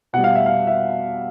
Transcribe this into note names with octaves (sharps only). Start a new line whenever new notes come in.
B2 G3 F#5
F5
E5
F5
E5